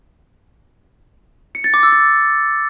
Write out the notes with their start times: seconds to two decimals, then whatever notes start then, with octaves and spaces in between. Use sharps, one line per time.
1.55 C#7
1.64 A6
1.74 D6
1.83 E6
1.92 A6